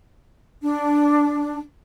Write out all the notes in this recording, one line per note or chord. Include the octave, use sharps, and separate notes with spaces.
D4